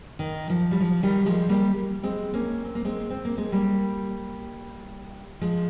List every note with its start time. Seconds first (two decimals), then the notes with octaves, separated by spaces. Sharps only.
0.19 D#3
0.50 F3
0.71 G3
0.80 F3
1.03 D#3 G3
1.26 F3 G#3
1.49 G3 A#3
2.03 G#3 C4
2.34 A#3 C#4
2.65 C4
2.75 A#3
2.85 G#3 C4
3.10 C4
3.25 A#3
3.38 G#3
3.52 G3 A#3
5.41 F3 G#3